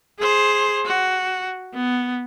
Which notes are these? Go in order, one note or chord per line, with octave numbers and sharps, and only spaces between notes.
G#4 C5
F#4
B3